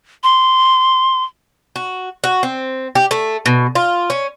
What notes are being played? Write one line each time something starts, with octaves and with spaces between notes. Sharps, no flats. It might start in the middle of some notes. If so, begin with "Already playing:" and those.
C6
F#4
F#4
C4
G4
A3
B2
F4
C#4